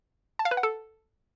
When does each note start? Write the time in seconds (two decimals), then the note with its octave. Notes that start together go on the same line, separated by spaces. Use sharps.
0.39 A5
0.45 F5
0.51 B4
0.57 F#5
0.63 A4